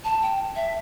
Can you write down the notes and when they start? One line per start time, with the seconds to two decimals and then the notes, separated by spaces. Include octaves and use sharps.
0.04 A5
0.22 G5
0.56 E5